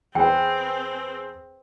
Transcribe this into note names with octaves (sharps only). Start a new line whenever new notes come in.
E2 C4 G#4 B4 G5